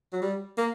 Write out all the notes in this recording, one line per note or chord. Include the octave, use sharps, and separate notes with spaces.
F#3
G3
A#3